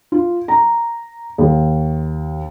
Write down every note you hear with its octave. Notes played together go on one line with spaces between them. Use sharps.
F4
A#5
D#2